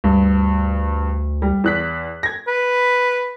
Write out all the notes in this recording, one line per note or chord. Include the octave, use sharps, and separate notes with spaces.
D2 G2
G3
E2 F#6 B6
G#6 A#6
B4